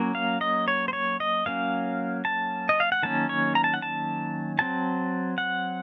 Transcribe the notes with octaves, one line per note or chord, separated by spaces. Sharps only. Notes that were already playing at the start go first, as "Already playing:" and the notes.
Already playing: F#3 A#3 C#4
F5
D#5
C#5
C5
C#5
D#5
F#3 A#3 C#4 F5
A5
D#5
F5
F#5
D#3 F#3 A#3 C#4 A5
C#5
A#5
A5
F#5
A5
F#3 C4 A5
F#5